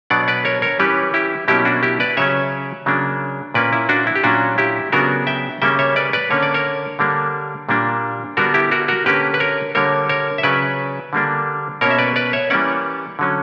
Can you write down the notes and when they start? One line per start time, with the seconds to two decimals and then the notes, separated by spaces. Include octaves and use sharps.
0.10 B2 F#3 B3 D4 D5 F#5
0.28 B4 D5
0.45 A#4 C#5
0.62 A#4 C#5
0.79 E3 G3 C#4 G4 B4
1.14 E4 G4
1.48 B2 F#3 A#3 C#4 E4 G4
1.65 D4 F#4
1.83 E4 G4
2.00 B4 D5
2.17 C#3 F#3 C#4 C#5 E5
2.86 C#3 F#3 A#3 D4
3.54 A#2 A#3 C#4 B4 D5
3.73 E4
3.89 D4 F#4
4.07 E4
4.15 G4
4.24 A#2 F#3 C#4 D4 F#4
4.58 E4 G4
4.92 C#3 F#3 B3 D4 F#4 A#4
5.27 E5 G5
5.62 C#3 G3 A#3 C#4 E5 G5
5.79 C#5 E5
5.96 B4 D5
6.13 B4 D5
6.30 D3 A#3 C#4 C#5
6.43 D5
6.54 A#4 C#5
6.99 D3 G3 A#3 D4
7.69 A#2 G3 A#3 D4
8.37 D3 G3 B3 D4 F#4 A#4
8.54 E4 G4
8.71 F#4 A#4
8.88 F#4 A#4
9.06 D3 A#3 C#4 G4 B4
9.34 B4
9.40 A#4 C#5
9.75 D3 G3 A#3 A#4 C#5
10.09 A#4 C#5
10.38 E5
10.43 C#3 F#3 C#4 B4 D5
11.13 D3 G3 A#3 D4
11.81 B2 A#3 C#4 A#4 C#5
11.91 E5
11.99 B4 D5
12.16 B4 D5
12.33 C#5 E5
12.50 E3 G3 A#3 C#4 D5 F#5
13.19 D3 F#3 C#4